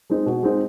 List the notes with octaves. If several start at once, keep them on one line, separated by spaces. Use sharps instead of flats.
G#3 C4 D#4
B2
G#3 C4 D#4